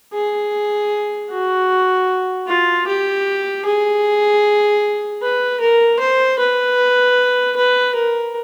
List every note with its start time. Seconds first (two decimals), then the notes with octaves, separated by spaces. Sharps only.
0.13 G#4
1.31 F#4
2.47 F4
2.87 G4
3.65 G#4
5.22 B4
5.61 A#4
6.00 C5
6.40 B4
7.56 B4
7.95 A#4